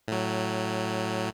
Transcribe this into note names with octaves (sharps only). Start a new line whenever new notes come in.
A2 F#3